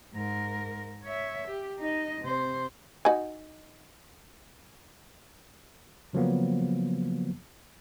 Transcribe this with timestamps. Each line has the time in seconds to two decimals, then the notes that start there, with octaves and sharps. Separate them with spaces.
0.14 G#2 A#4
1.04 C#5 E5
1.48 G4
1.79 D#4 D#5
2.21 C3 C5
3.05 D#4 F#4 G#5
6.13 C#3 F3 F#3 A#3 B3